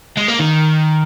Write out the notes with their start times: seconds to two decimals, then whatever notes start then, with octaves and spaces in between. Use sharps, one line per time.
0.17 G#3
0.28 A#3
0.39 D#3